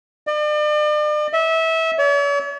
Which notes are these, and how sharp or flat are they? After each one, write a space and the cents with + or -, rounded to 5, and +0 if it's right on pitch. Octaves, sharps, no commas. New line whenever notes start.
D5 +40
E5 -25
C#5 +45